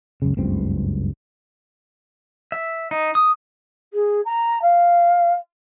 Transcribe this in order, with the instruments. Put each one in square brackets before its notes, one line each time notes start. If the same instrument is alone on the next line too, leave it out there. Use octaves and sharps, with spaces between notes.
[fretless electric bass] C#2 F#2 C#3
F#1 C#2 G2 C4
[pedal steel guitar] E5
D#4
D#6
[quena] G#4
A#5
F5